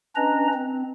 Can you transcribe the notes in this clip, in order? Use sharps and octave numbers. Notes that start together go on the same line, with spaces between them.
C#4 D4 B4 D#5 A#5
C4